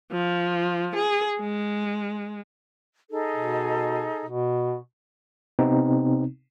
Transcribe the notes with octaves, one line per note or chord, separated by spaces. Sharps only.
F3
G#4
G#3
D#4 G#4 A4
B2
B2
C3 B3 C4 D#4